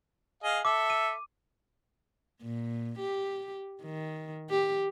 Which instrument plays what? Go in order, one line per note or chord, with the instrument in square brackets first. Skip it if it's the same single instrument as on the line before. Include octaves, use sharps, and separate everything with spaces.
[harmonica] G#4 D#5 F5
[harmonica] A4 [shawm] E5 [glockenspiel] D6
[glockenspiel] D#7
[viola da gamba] A#2
G4
D#3
G4